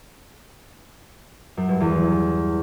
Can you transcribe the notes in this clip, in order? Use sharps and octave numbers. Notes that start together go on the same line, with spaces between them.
F#2
G2
E2